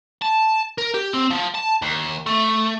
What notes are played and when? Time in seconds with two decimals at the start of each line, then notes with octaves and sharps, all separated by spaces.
0.22 A5
0.78 A#4
0.95 G4
1.13 C4
1.30 F3
1.54 A5
1.82 D#2
2.27 A3